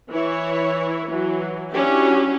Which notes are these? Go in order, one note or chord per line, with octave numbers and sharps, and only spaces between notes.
E3 E4 C#5
E3 F#3
F#3 C#4 D4 E4 F#4 G4